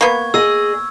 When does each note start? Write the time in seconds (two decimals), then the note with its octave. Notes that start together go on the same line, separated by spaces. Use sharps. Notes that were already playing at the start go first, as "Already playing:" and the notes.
0.01 A#3 B3 C#6 G#6
0.34 G#4 D#5 E6